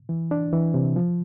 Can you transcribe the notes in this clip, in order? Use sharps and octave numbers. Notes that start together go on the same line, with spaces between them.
E3
D4
E3
C3
F3